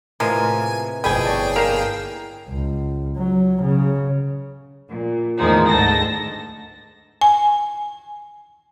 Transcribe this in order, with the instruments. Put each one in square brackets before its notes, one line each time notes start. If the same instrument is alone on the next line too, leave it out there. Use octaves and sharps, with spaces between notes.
[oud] A2 C3 E3 [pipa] F3 G#3 A#3 [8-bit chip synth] G#5
[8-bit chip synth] G1 G#4 G5 [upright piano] F2 B2 [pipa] B4 G#5
[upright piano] C#5 D5 A5
[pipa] A#3 [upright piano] C7 E7 F7
[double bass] C#2
F#3
C#3
[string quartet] A#2
E2 A2 D#3 F3 G#3 D#4
D2 G#2 G#3 A4 A5 A#6
[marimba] G#5